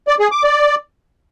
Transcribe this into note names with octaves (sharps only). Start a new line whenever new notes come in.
D5
G#4
D6
D5